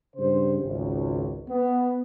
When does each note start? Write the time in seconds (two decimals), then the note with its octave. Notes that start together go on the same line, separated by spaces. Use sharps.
0.16 G2 C#3 C5
0.60 G#1 C#2
1.48 B3